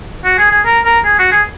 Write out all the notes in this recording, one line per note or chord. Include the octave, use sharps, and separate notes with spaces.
F#4
G#4
G#4
A#4
A#4
G#4
F#4
G#4